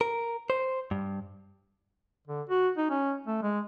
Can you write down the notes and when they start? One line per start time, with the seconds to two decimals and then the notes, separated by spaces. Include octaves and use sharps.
0.01 A#4
0.50 C5
0.91 G2
2.27 D3
2.50 F#4
2.77 D#4
2.90 C#4
3.27 A3
3.42 G#3